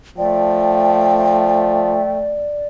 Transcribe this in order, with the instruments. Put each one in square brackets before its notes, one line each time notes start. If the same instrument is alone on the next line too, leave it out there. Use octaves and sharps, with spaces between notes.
[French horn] F3 [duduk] A3 [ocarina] D5 [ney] G5